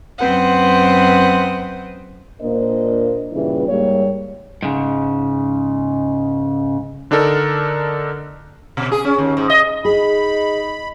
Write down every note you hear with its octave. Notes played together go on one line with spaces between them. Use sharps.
F#2 C4 B4 C5 F#5 D#6
A#2 A#3 D4 A#4 C5 D#5
G2 A#2 C#3 E3
G#2 G3 A#3 C#5
G#2 C#3
D3 D4 D#4 A4 A#4
B2
G#4
C#4
D#2
G#2
D#5
D#4 G#4 D#5 B5